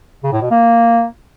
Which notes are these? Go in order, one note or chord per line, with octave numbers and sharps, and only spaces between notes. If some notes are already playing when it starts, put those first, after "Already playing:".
C#3
A2
B2
A#3